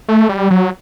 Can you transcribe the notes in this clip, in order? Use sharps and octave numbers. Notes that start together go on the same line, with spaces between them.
A3
G3
F#3